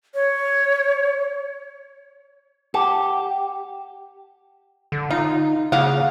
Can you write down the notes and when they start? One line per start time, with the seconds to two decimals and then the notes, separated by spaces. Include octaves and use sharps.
0.15 C#5
2.74 G4 F#5 A5 D6
4.92 D3
5.11 D#4 F4
5.72 C#3 A#3 F5 F#5